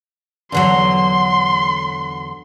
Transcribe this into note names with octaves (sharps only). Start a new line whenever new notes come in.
E2 D3 F#3 C6